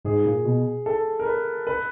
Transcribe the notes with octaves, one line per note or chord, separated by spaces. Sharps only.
G#2 G#4
A#2
B2
A4
A#4
B4
B4